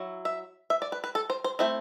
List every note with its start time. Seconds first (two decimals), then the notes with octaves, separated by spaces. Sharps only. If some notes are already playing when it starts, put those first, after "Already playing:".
Already playing: F#3 E4
0.25 E5
0.70 E5
0.82 D5
0.92 B4
1.04 B4
1.15 A4
1.30 C5
1.44 C5
1.59 A3 C4 E4 E5